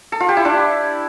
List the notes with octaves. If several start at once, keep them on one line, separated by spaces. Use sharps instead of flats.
A4
F4
G4
E4
D4